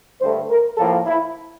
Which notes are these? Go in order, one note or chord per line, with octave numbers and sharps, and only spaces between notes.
G2 D3 A3 C5
A#4
A2 F3 A#3 A4
E4